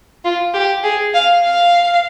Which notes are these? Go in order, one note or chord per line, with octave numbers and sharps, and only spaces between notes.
F4
G4
G#4
F5
F5